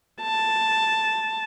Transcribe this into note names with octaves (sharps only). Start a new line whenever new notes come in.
A5